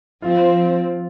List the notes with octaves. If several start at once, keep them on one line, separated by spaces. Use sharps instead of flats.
F3 C4 F4